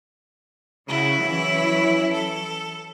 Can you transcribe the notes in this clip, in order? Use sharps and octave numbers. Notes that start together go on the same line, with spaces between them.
C#3 E4 F#4
E3 F#3 C#4
A4